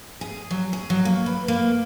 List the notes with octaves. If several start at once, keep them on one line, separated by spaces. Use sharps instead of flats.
G#4
F#3
G#4
F#3
A#3
B4
A#3